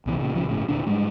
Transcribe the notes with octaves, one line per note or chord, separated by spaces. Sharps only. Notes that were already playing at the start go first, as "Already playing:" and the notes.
C2 B2 E3
A#2 C#3
A#1 C#3 F3
G1 A2 C#3
E1 A#2 D3 D4
G#2 G3 G#3